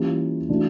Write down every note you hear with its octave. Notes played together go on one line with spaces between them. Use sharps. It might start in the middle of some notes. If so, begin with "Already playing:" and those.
Already playing: E3 G3 A#3 C#4 F4
E3 A3 D4 F#4